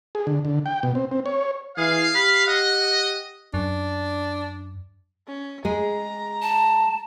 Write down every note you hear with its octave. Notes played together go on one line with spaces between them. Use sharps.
G#4
D3
D3
G5
B2
C4
C4
C#5
E3 G#4 F5
G4 B5
D#5 F#5
F#2 D4
C#4
G#3 G#4 A#5
A5